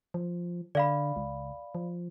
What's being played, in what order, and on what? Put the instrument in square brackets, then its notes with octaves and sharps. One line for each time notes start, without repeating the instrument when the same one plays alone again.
[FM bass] F3
[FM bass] D3 [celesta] D5 F5 B5
[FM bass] C#2
F3